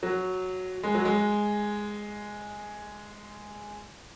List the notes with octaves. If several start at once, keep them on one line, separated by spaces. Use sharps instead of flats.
F#3
G#3
F#3
G#3